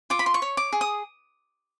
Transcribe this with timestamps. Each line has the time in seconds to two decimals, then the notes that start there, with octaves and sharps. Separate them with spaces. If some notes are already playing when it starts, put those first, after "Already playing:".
0.10 F4 D6
0.19 B5
0.26 C6
0.34 C#6
0.42 C#5
0.57 D6
0.73 G#4
0.81 D#6